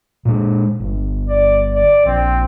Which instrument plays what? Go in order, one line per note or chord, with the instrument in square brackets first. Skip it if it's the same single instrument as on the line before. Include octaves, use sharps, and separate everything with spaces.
[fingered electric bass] A#2 G#3
G1
[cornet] D5
D5
[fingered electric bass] A#1 [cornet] C4